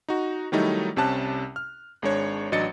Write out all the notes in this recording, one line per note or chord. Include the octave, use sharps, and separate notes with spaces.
D#4 F#4
D#3 F#3 G3 A3 D#4 E4
C2 C3 C#4 A5 F#6
F6
G#1 G#3 D4 C#5 G#6
A1 F#3 D4 D#5 A6 C#7